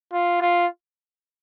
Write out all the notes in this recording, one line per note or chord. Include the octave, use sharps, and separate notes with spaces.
F4
F4